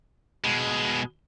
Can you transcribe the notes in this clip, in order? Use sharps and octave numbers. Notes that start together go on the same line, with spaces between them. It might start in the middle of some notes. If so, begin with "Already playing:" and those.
B2 G#3